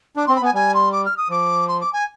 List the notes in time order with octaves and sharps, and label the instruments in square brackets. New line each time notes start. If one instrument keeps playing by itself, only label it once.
[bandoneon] D4 [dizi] D6
[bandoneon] C4 [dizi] C6
[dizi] B5
[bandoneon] B3 [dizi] G#5
[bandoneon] G3 [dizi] G#5
[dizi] C6
D6
F6
D#6
[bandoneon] F3 [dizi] D6
[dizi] C6
D6
G#5